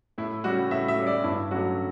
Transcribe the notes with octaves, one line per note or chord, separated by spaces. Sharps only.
A2 E4
G3 C#4 F#4
A2 E5
E5
G3 C#4
D5
G2 E4
F#3 A3 C#4 F#4